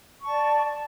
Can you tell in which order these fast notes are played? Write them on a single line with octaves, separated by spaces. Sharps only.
C#6 A5 D5